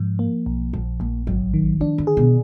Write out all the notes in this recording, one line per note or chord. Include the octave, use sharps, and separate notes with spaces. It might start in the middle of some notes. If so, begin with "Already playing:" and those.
Already playing: G#2 F3
A#3
B1
A#1 F3
A#1 A#3
G#1 F#3
D#3
F3 D4
D3
G#4
B2